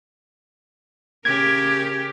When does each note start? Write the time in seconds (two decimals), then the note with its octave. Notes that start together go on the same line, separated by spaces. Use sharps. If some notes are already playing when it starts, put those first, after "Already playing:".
1.25 C#3 G4 A#4 G#6